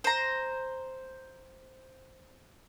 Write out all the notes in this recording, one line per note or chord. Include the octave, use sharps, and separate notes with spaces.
C5 A#5